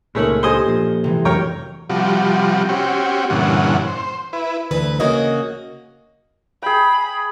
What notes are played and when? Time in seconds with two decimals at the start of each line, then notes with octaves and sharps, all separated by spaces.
0.15 C#2 A#2 G#3 A3 C#4 D#4 A#4 F#7
0.43 G4 A4 C5 D#5 G#5 G7
0.67 A#2 F3
1.04 C3 E3 G#3
1.25 F2 A2 F#3 A#4 C#5 G5 G6
1.90 C3 F3 G3 F#4
2.69 C4 C#4 F#4 G4
3.30 G2 A#2 D3 E3 C#4 F#5
3.87 C5
4.33 E4 B4
4.71 D2 E3 B4
5.00 C#3 A#3 F#4 C#5 D#5
6.62 G#4 G5 B5